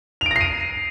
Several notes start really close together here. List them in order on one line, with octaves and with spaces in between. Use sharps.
F7 D7 A#6 C7 D#7